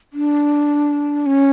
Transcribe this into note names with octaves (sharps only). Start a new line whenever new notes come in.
D4
C#4